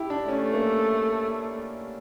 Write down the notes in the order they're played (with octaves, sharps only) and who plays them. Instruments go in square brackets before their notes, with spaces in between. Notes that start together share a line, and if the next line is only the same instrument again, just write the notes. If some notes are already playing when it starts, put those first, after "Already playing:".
Already playing: [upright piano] E4 G4
D4
[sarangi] A3 [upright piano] C#4
[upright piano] A#3